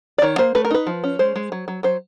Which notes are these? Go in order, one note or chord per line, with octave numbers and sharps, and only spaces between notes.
D5
D#3 C#5
A#3 C5
A3 B4
A#4
D#4 B4
F3
C#4
G#3 C5
G#3
F#3
F#3
F#3 C5